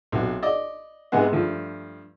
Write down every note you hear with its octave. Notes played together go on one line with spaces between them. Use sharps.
B1 C3 F#4
D5 D#5
G#2 C3 G#3 B3 F#5
G2 F3 A3